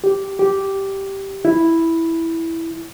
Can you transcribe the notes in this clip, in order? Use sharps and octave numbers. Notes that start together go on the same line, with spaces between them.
G4
G4
E4